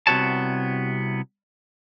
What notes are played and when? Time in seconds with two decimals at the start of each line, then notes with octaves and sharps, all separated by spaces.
0.07 C2 C3 B3 F#4 C#5 A5